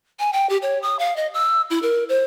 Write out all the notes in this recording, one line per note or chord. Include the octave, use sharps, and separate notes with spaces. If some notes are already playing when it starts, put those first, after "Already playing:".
G#5
G5
G4
C#5
D#6
F5
D#5
E6
E4
A#4
C5